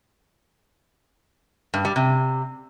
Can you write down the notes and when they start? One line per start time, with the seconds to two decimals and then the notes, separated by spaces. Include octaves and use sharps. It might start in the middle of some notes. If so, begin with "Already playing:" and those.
1.74 G2
1.85 G3
1.96 C3